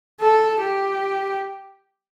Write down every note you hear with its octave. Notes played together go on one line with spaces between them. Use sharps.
A4
G4